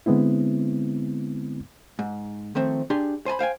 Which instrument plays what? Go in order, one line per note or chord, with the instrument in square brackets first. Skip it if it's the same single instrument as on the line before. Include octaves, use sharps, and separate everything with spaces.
[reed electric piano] D3 G#3 B3 C4 E4
[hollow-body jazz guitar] G#2
D#3 F3 A3 C4
D4 G4 G#4 C6
C5 G#5 A5 B5
C5 F5 G5 G#5